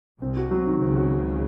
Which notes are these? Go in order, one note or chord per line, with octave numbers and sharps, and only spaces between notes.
C2 C3 C4
F#4
F#3
D#3
C#2 C#3 C4
F#4